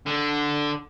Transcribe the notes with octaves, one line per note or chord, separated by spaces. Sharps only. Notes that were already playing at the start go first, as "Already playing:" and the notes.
D3